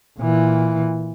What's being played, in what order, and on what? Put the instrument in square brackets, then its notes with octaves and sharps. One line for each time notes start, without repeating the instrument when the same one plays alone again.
[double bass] A#2 E3